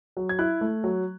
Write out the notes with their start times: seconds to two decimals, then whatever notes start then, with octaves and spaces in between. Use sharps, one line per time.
0.17 F#3
0.29 G#6
0.39 E4 F#6
0.61 A3
0.84 F#3